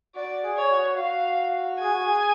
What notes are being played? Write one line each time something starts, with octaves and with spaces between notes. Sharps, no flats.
F#4 D5
G#4
C#5
F#4
F#4 F5
G#4 G#5
F#4
G#4